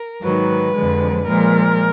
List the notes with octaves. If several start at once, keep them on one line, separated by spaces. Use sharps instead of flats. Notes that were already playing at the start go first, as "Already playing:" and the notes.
Already playing: A#4
G#2 D#3 F#3 B4
F2 D3 F3 G#3
A#2 F3 G#3 A#4